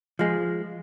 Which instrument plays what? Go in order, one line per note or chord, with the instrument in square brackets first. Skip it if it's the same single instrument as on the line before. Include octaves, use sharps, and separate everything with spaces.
[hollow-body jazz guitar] F3 G#3